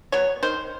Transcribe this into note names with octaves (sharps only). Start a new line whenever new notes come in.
F#3 B3 C#5
D#3 C5